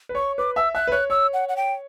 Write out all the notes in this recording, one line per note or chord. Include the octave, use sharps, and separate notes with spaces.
B4
C#5 C#6
B4 D6
E5 E6
E5 F#6
B4
C#5 F#6
C#5 E6
F#5
F#5
G5